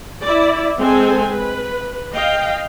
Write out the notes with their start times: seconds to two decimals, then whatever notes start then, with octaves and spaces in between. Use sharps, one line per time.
0.23 E4 D5
0.78 G#3 C4 A4 G#5
1.32 B4
2.13 D#5 F5 G5